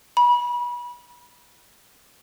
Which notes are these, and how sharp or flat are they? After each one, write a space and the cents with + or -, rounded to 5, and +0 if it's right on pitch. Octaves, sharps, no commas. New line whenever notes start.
B5 -30